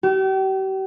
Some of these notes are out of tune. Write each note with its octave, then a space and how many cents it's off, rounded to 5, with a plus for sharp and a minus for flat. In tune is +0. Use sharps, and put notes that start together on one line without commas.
G4 -40